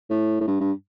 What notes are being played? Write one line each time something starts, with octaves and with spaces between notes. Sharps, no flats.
A2
A2
G2
G2